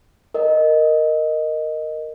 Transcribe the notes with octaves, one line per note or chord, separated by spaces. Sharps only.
A#4 D#5